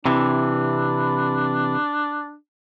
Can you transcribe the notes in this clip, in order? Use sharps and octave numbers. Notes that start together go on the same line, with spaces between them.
C3 E3 D4